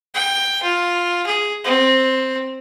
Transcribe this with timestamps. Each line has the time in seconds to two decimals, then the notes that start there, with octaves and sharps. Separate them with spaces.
0.15 G5
0.63 F4
1.26 G#4
1.65 C4